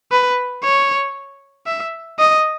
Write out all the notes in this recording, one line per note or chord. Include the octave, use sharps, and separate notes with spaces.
B4
C#5
E5
D#5